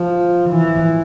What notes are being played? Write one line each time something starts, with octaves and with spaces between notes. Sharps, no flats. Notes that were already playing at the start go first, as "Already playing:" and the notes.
Already playing: F3
E3